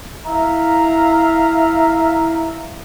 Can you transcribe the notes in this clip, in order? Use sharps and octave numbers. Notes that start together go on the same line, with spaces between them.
E4 E5 F5 A#5